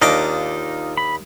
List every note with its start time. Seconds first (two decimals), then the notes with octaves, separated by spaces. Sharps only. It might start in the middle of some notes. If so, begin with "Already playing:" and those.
0.02 D#2 D4 D#4 F4 D#5 D6
0.97 B5